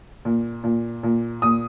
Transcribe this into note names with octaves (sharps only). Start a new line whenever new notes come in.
A#2
A#2
A#2
A#2 D#6